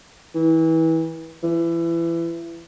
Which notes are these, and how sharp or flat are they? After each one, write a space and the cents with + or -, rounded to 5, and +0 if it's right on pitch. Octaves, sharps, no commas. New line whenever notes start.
E3 -30
E3 +25